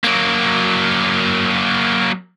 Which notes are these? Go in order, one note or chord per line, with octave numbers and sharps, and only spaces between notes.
F#3 A#3